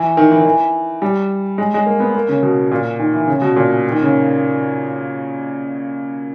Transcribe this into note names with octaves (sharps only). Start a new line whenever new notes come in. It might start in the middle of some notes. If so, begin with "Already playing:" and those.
Already playing: E3
D#3
E3
D#3
E3
G3
G#3
G#3
A#3
B3
A#3
C#3
B2
A#2
D#3
E3
C#3
B2
A#2
D#3
C#3